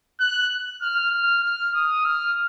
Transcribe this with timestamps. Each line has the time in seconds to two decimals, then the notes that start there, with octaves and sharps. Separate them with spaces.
0.20 F#6
0.81 F6
1.12 F6
1.43 F6
1.74 D#6
2.05 F6